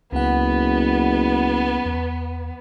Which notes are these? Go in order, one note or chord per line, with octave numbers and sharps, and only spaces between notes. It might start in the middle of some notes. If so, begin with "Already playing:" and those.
F#1 C#2 B3 F#5
E2